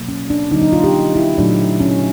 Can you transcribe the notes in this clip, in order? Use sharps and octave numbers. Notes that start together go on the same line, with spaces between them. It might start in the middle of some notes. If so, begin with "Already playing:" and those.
Already playing: B2 F#3 A#3
C#4
D4
D3 F#3 A#3 D#4
D#4
F4
G4
E4
A#2 F#3 A3 D4
C#4